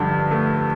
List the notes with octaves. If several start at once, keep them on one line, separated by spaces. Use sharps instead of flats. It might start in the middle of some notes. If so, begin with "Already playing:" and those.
Already playing: G2 D3 F3 G6
A3